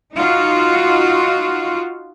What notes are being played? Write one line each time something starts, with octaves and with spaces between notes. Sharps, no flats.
D#4 F4 F#4